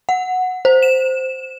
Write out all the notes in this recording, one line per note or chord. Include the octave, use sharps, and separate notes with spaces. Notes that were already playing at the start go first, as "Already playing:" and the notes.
F#5
C5
E7